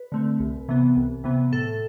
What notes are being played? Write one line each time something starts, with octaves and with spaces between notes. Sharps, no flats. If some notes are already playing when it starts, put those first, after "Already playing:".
Already playing: B4
D3 A3 C4
C2
C3 E3 B3
C2
C3 E3 B3
A2 A4